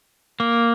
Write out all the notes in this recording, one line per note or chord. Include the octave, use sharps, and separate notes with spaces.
A#3